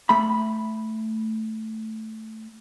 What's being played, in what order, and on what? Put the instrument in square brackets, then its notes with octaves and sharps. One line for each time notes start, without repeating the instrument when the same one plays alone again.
[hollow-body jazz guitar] A3 B5